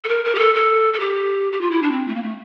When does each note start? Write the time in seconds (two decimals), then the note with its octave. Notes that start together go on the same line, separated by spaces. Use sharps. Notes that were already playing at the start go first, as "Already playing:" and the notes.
0.04 A4
0.09 A#4
0.25 A#4
0.35 G4
0.39 A4
0.55 A4
0.93 A4
1.00 G4
1.52 G4
1.61 F4
1.71 E4
1.83 D4
1.92 C4
2.08 A3
2.15 A#3
2.23 A3